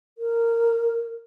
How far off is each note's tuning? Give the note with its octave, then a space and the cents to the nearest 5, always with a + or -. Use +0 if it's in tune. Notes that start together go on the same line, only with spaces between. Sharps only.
A#4 -10